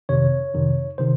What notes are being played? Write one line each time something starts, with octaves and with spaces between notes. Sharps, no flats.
F2 C3 D#3 C#5
F2 C3 D#3
C3 D#3 C5